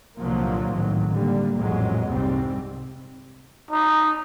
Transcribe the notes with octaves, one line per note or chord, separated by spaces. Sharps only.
C2 A#2 D3 F3 F#3 A#3
G#1 A2 D#3 F#3
D3 G3 A#3
A1 F2 A#2 F#3 G#3
C2 G#2 G3 C4
D#4